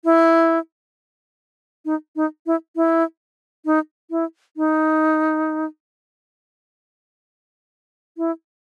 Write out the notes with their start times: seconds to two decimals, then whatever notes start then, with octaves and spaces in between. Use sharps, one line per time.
0.05 E4
1.85 D#4
2.16 D#4
2.46 E4
2.76 E4
3.65 D#4
4.11 E4
4.57 D#4
8.18 E4